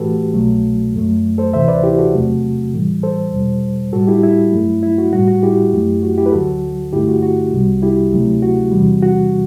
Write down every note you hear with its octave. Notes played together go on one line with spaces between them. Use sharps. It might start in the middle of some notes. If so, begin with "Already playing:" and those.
Already playing: A2 E3 A3 F#4 G4 A4 B4
C2 B2 F#3 A3
F#2 F#3 A3
A4 C5
D2 C3 E3 C5 E5
B4 D5
E4 G4
F#4 A4
E2 C3 F#3 A3
A2 E3 G3
A4 C5
E2 B2 G3
A2 G3 F#4 A4
E4 G4
E4
G2 F#3 A3
E4
F#4
A2 G3 F#4
F#4
E4 G4
F#2 F#3 A3
F#4
E4 G4
B4
D2 D3 F#3 F#4 A4
G2 D3 A3 E4 G4
F#4
F#4
C2 C3 G3
E4 G4
D2 C3 F#3 A3
F#4
E2 C3 E3 G3
F#4